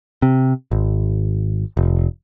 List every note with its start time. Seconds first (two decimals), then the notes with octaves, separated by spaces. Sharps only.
0.22 C3
0.71 G#1
1.77 F1